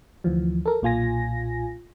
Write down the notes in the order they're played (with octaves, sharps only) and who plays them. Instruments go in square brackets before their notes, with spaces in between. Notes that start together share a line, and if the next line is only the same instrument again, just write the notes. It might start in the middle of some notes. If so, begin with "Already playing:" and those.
[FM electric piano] D2 E3 F3
A4 A#4
B1 A#2 F4 G#5 A#6